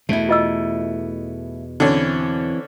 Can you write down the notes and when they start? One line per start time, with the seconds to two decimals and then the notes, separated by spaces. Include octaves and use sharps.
0.09 E2 B2 A3 E4
0.29 F4 D#5 E6
1.80 D3 E3 C4 C#4